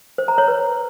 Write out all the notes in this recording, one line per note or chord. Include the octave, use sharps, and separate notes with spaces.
C5
A#5
C#5
B4